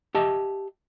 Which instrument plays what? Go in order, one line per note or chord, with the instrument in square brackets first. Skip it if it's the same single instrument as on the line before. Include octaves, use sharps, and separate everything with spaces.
[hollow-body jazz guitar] G4 D#5 E5 A5